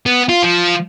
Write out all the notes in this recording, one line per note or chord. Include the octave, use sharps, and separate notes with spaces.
B3
F4
F3